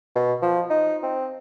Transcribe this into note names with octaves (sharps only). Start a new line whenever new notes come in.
B2
F3
D#4
C4